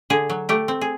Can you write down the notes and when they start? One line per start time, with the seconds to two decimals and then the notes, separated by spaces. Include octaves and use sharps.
0.10 D3 G#4
0.30 F#3
0.49 A3 G4
0.68 C4
0.81 G#4